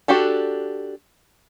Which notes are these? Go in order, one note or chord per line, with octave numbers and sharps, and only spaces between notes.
D4 F#4 G4 A4